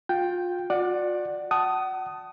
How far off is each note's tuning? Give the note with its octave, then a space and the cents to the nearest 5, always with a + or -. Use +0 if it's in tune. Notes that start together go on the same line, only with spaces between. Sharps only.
F4 +25 G5 +0
F4 +45 D5 +10 F#5 +0
F#5 +35 A5 +0 D#6 +0